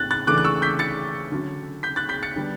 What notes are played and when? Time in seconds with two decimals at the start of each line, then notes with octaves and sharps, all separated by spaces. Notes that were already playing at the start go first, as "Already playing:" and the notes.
Already playing: A2 A3 F#6 A6
0.11 F#6 A6
0.27 C#3 E3 A3 D4 D6 F#6
0.38 F#6
0.44 C#6 E6
0.62 G6 B6
0.79 A6 C#7
1.32 D3 F#3 C#4
1.83 G6 B6
1.96 F#6 A6
2.09 G6 B6
2.23 A6 C#7
2.36 D3 G3 B3 D4